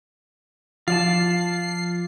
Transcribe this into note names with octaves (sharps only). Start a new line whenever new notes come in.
F3 F4 D5 A5 C7